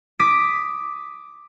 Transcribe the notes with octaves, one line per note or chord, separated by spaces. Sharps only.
D6 D#6 B6 D7